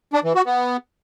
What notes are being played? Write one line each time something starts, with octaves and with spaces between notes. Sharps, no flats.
D4
E3
F#4
B3